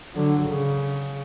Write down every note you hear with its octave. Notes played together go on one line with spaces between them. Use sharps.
D3 F#3
C#3